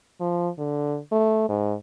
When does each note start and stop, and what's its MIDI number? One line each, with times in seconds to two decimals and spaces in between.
0.20 0.49 53
0.58 0.99 50
1.12 1.45 57
1.49 1.75 44